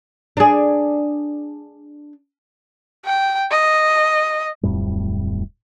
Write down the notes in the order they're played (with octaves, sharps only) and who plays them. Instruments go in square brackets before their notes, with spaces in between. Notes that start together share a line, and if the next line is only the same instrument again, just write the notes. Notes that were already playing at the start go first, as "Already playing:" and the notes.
[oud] D4 G#4
[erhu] G5
D#5
[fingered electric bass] D1 F2 A2 G3